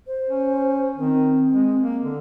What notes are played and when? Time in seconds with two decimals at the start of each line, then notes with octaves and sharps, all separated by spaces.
0.07 C5
0.30 C#4
0.97 D#3 C4
1.52 G#3
1.82 A#3
2.04 D3